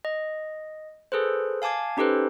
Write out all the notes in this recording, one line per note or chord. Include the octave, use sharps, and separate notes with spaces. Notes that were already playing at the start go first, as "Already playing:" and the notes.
D#5
G#4 A4 B4 C5
F5 G#5 A5 D6 G#6
C#4 D#4 G4 A4 B4 C5